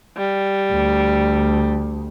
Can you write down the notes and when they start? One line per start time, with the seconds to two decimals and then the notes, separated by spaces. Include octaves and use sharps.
0.17 G3
0.71 D2